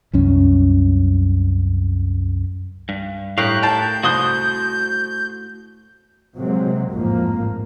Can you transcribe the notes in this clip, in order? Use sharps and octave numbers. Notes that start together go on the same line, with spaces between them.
C2 F#2 C#4
G2
A2 G4 A#4 F5 F#6
G5 A5 G6
C2 F#4 C6 D#6 F#6
C3 F#3 G#3 A#3 C4
A1 F2 G#2 F3 A#3